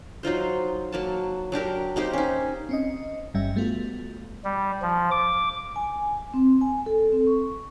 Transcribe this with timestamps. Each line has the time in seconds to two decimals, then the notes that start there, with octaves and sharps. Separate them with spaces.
0.23 F#3 D#4 F4 C5
0.92 F#3 A#3 A5
1.52 F#3 D4 G4 A#4
1.96 A#3 D#4 G4 C5
2.13 C#4 D#4
2.69 C4 C#4 D#5
3.34 G1 G2 G3 C#4 E5
3.56 G3 A3 B3 F4 F#4
4.45 G3
4.82 F3
5.11 D6
5.76 G#5
6.34 C4
6.61 G#5
6.86 A4
7.12 C4
7.27 C#6